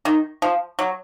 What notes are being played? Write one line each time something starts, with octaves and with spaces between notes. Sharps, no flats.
D#3
F3
F#3